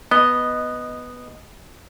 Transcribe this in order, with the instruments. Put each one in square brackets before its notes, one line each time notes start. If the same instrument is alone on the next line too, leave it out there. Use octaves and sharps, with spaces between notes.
[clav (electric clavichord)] B3 [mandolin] D#5